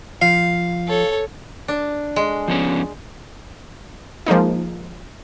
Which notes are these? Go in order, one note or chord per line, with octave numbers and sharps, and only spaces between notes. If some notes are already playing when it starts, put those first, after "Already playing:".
F3 F5
A4 C#5
D4
G#3
F3 B3 C#4
F3 G#3 A#3 D#4